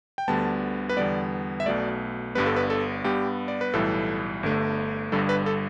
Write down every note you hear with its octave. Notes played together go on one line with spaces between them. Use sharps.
G5
D2 D3 G3 B3 A5
B4
E2 D3 G3 B3 D5
E5
B1 B2 A3 D5
G1 G2 G3 B3 B4
A4
B4
A4
G2 G3 B3 G4
D5
B4
B1 A2 E3 G3 A4
G1 G2 D3 A3
G1 G2 D3 G3 A4
B4
A4